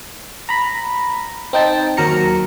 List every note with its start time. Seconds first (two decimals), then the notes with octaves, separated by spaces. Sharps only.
0.49 A#5 B5
1.53 C4 D#4 G5 A5
1.97 D#2 F#3 A#4 A#5 C#7